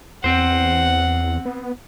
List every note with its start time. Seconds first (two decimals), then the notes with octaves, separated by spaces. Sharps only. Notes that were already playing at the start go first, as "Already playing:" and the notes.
0.24 E2 C4 C5 F#5
1.45 B3